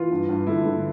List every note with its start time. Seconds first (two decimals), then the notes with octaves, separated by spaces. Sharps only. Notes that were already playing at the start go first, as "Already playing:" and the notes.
Already playing: E3 F4
0.11 G2
0.29 G2
0.47 D3 E4
0.65 D3